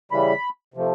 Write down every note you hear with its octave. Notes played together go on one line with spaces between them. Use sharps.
C#3 E3 G3 B5
C3 F3 A3